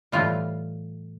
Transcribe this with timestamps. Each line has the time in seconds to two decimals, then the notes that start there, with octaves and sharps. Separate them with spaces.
0.12 A2 E3 G3 F4